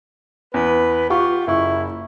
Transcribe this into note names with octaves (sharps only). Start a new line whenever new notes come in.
E2 B4
F4 G4 F#5 C#6
F#1 E4 C#6